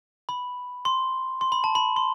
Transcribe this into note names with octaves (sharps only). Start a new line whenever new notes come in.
B5
C6
C6
B5
A5
B5
C6